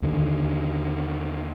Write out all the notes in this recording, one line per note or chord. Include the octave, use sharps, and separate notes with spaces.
D#2 D3 D#3